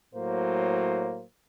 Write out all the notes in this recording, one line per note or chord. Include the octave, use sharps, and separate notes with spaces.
A2 F#3 A#3 C5